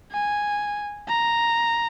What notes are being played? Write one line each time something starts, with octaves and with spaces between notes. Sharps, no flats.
G#5
A#5